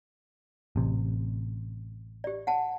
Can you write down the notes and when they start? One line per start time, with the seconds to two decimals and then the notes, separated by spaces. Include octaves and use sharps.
0.76 A1 C3
2.24 G4 D5
2.47 F#5 G#5 A5